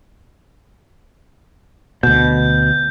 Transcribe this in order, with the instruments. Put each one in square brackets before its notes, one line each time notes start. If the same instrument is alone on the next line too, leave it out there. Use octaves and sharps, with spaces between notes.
[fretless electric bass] D2 B2 [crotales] G6